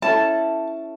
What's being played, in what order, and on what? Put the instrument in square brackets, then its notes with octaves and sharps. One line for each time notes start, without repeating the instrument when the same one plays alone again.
[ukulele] C#4 E4 A4 A5